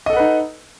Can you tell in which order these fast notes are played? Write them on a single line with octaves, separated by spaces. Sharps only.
D#5 A4 F#5 B4 D#4